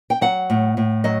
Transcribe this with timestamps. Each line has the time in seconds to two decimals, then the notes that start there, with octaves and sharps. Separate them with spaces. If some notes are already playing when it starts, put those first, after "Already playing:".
0.10 G5
0.21 F#3 F#5
0.50 A2
0.77 A2
1.04 F#3 D#5